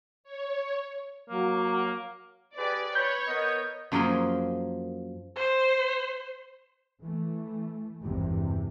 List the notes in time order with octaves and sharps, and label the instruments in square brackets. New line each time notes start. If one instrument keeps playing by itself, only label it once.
[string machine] C#5
[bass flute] F#3 [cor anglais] A#3
[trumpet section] G4 G#4 B4 [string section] D5
[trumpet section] B4 B5 [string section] C#5 [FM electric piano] G6
[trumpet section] B3 A#4 D#5
[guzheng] F#2 F3 A#3 G#4 A#4 C6
[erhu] C5
[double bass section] E3 A3
G#1 E2 G2 C3 E3